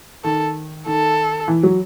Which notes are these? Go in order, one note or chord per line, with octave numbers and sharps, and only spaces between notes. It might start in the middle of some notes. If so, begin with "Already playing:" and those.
D#3 A4
D#3 A4
E3
F#3